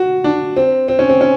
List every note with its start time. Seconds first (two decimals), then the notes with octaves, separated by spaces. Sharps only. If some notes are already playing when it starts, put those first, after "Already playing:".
Already playing: F#4
0.24 D4
0.56 C4
0.88 C4
0.99 C#4
1.10 C4
1.21 C#4